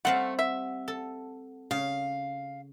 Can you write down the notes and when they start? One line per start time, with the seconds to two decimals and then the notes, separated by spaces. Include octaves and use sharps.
0.05 G3 A3 C4 F5 F#5
0.39 E5
0.88 A4
1.71 C#3 F5